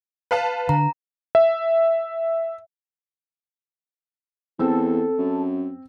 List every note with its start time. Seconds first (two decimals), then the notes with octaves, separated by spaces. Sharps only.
0.31 B4 F5 A5
0.69 D3 A#5
1.35 E5
4.59 E2 C4 A4 E6
5.19 F#2